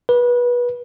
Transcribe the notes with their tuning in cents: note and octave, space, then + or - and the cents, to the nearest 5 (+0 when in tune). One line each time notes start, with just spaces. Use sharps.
B4 -25